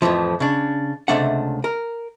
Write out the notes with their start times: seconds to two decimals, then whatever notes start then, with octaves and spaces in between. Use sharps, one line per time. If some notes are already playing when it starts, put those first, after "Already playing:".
0.02 F2 A2 E3 F3
0.40 C#3 D4
1.08 C#2 F#2 C3 A3 D4 F#5
1.64 A#4